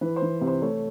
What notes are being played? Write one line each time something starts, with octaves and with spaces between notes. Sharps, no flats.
E3 B4
C5
E3
C3
C5
A3 C#5